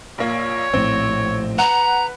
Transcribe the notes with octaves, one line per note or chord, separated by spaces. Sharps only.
A#1 A#3 C#5
A#1 A2 C4
B4 F#5 A#5